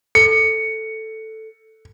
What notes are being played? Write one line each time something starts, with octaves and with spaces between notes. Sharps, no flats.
A4 C#7